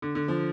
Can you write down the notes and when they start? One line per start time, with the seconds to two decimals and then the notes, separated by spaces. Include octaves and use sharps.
0.02 D3
0.15 D3
0.28 F3